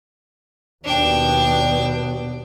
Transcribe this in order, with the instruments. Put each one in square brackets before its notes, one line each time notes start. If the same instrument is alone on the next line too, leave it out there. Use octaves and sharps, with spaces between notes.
[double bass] D#2 B2 [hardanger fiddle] D4 G5